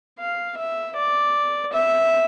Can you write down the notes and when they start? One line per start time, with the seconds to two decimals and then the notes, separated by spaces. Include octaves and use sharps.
0.19 F5
0.57 E5
0.96 D5
1.73 E5